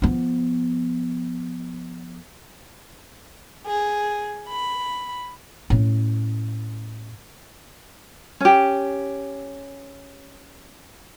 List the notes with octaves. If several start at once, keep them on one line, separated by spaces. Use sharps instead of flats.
F3 B3
G#4
B5
A2 C#4
C#4 G4